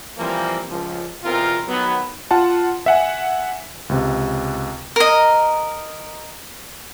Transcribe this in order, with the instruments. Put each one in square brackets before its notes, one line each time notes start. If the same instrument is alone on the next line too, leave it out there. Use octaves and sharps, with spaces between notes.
[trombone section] E3 F3 G3 A#3 C4
C#2 F3
E2 B2 C4 F4 A#4
D#3 F#3 B3
[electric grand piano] F4 F#5 A5
E5 F#5 G#5
C#2 C3
[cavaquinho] A#4 D#5